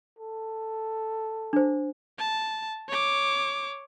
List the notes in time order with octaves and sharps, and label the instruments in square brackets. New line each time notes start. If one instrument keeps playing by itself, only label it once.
[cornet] A4
[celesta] D4 C5
[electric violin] A5
C#5 D6